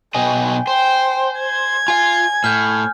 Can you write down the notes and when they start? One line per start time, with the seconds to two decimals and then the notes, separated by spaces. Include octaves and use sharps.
0.14 B2 F#3 D#5 G5 G#5
0.67 C5 G5
1.39 G#6
1.88 F4 F5 G#5
2.44 A2 F6 G6